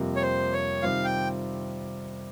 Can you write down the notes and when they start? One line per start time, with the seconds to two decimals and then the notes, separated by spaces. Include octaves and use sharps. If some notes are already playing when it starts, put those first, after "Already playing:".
Already playing: F2 C3 G3 A#3
0.16 C#5
0.22 C5
0.53 C#5
0.82 C3 D#3 G3 C4 F4 F5
1.05 G5